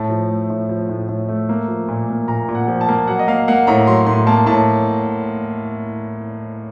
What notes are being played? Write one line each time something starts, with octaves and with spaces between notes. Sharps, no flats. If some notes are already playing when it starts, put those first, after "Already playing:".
Already playing: A2 A5
F3
A3
A2
F3
A2
A2
A3
A#3
F3
A#2
A#3
A#2 A#5
A#2
F#5
F3
A5
A#3
F#3 F#5
D#5
A#3 F5
A#3 F#5
A2 A#5
F#3 C6
A2 C6
A#3 A5
A2 A5